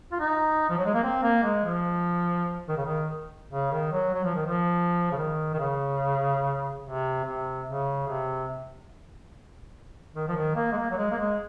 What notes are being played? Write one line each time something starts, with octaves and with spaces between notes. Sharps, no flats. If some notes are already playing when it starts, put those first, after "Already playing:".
F4
D#4
F3
F#3
G#3
A#3
C4
A#3
G#3
F3
D#3
C#3
D#3
C#3
D#3
F#3
F#3
F3
D#3
F3
C#3
D#3
D#3
C#3
C3
C3
C#3
C3
D#3
F3
D#3
A#3
G#3
A#3
F#3
G#3
A#3
G#3